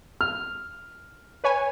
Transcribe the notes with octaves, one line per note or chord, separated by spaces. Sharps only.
F6
B4 C#5 G#5